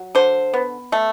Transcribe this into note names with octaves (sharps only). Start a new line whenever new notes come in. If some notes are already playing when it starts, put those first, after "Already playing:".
Already playing: F#3
D3 C5
B3
A3